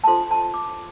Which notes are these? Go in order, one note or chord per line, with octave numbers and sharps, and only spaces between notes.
A5
D4 F4 A4 C5 C6
A5
D6